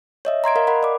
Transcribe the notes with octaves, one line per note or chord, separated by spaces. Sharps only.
C#5 D#5 E5
A#5 C6 G#6 D7
A#4 D#5 F5
A#4 F#5 B5
D5 D6